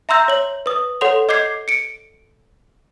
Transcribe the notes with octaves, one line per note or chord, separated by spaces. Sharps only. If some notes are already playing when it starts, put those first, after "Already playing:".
E5 A#5 C6 E6 G6 A#6
C#5 F#7
B4 D#6
A4 C#5 F#5 C6 F7
D#5 D6 G6 G#6 C7
C#7 D7